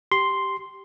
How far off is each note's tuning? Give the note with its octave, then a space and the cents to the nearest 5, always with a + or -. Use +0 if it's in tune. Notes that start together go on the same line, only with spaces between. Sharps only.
G4 -5 C6 +0